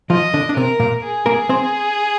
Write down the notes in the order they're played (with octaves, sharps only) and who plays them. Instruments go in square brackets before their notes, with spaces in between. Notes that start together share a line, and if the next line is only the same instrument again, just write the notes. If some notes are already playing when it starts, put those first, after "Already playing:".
[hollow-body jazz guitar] F3 F4 [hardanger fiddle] D#5
[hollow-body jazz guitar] D3 D4
D4
[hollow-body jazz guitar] C3 C4 [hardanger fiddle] A#4
[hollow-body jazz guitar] A#2 A#3
[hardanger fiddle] G#4
[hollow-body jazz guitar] A#3 A#4
C4 C5